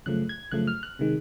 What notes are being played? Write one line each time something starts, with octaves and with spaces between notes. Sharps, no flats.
F#2 C#3 F3 A3 F#6
G#6
F#2 C#3 F3 A3 F#6
F6
F#6
C3 D#3 G#3